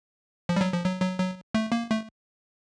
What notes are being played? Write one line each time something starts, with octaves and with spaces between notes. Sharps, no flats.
F3
G3
F#3
F3
F#3
F#3
F#3
A3
A#3
A3